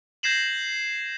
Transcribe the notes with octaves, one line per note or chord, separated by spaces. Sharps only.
G6 G#6 A#6 C7 E7 F#7